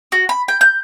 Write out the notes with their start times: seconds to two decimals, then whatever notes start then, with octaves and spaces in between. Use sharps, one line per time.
0.12 F#4
0.29 B5
0.48 G5
0.61 G6